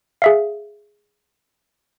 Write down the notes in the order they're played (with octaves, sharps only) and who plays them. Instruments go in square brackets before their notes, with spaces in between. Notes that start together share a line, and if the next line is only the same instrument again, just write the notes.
[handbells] G#4 E5 F5